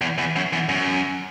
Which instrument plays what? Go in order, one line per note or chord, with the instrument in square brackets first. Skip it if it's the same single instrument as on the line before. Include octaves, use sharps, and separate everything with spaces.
[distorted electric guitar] E2
E2
F#2
E2
F#2